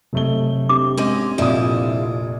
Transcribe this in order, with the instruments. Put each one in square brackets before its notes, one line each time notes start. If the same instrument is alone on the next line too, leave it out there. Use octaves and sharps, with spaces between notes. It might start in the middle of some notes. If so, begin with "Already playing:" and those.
[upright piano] F1 A3 G7 [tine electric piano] C3 F#3
[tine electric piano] C4 D4 G4 [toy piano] D6
[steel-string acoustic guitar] G#2 G#3 C#4
[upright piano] F1 A#2 D#6 [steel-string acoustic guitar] F3 E4 D5